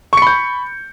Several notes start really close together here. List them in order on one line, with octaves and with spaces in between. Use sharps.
C#6 C#7 B5 G6